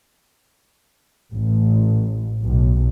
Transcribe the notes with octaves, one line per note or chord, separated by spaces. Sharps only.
A1
B1